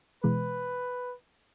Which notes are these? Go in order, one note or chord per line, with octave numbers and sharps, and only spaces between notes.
B2 E3 G#3 B4